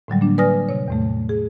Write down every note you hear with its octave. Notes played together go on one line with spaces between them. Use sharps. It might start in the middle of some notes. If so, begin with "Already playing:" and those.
A2 D3 F#3 G3
A#3 D4
B4 D5 G#5 D#6 F6 A#6
C3 C#5
E2 A2 A3
G#4